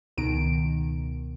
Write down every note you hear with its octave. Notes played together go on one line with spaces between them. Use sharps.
C#2 B2 D#3 D7